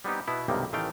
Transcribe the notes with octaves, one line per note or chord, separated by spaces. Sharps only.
G3 B3 C4 D#4 G4
B2 B3 E4
B1 G2 C3 D#3 G3 A#3
A1 D#3 E3 A3 F5 G5